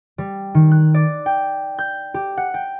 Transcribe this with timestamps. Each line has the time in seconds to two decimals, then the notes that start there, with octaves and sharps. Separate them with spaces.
0.18 G3
0.54 D#3
0.71 F#6
0.94 D5
1.26 G5
1.79 G6
2.14 G4
2.37 F#5
2.54 G5